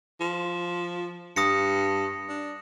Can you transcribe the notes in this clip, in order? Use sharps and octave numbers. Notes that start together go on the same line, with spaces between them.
F3
G2 D#6 A#6 C#7
D4